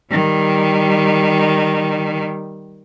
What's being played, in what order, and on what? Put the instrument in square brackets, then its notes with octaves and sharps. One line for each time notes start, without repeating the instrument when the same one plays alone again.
[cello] D#3 G3